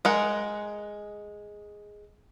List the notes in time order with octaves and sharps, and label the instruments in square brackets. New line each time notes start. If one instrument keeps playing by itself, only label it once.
[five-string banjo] G#3 A#4 F#5